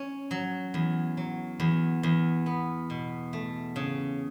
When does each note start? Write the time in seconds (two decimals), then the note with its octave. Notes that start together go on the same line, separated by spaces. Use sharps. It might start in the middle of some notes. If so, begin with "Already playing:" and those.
Already playing: C#4
0.31 F#3
0.74 E2
1.17 F#3
1.60 E2
2.03 E2
2.46 B3
2.90 B2
3.33 A3
3.76 C#3